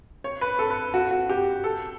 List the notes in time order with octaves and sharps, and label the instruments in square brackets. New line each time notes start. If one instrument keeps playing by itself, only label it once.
[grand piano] C#5
B4
A4
B4
F#4
F#4
G4
A4